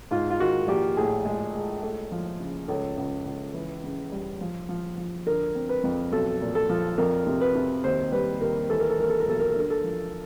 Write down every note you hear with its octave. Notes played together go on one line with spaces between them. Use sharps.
G#2 F4
F4
D#3 F#4
A#1 G4
A2 G#4
G#3
G#3
A3
F3
C#3
C#2 A4
C#2
C#2
E3
C#3
G3
F3
F3
F3
D3 A#4
C4
B4
F2
B1 A4
A#2
A4
F3
F2 A#4
C3
B4
C3
D#2 C5
G3 B4
D#2 A#4
E3 A4
A#4
A4
E3 A#4
A4
A#4
B1 A4
A#4
A4
D3 A#4
A4
F3